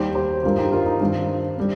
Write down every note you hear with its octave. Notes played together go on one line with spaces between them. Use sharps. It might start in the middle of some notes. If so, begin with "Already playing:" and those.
Already playing: D#2 D#3 G3 G4 C5
G4 C5
G2 G3 C4 F4 A#4
D#4 G4
F4 A#4
D#4
G2 D#3 C4 F4
G3 C4